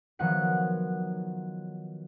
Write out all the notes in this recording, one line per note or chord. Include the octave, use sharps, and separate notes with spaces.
D#3 F3 F#3 B3 F#5 C#7